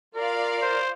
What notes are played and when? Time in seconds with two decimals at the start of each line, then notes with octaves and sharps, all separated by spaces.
0.15 F4 A#4 D5 F5
0.62 C5